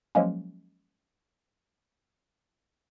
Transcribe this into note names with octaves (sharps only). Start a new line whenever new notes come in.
F3 F#3 G#3 A#3 C#4